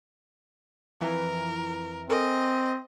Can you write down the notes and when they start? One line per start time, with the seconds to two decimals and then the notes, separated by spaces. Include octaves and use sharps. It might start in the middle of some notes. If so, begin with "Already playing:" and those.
1.01 F2 E3 A#4
2.09 C4 A4 A#4 D#5 G#5